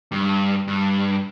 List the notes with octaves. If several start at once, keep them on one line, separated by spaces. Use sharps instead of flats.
G2
G2